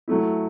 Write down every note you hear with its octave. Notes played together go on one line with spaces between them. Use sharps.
F#3 A3 E4